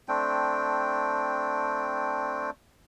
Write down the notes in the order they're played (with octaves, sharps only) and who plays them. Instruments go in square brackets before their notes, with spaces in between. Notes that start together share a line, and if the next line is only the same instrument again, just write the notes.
[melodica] A3 C4 D4 G5